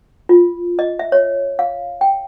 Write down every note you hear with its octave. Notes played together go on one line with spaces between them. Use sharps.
F4
D#5
E5
C#5
F5
G5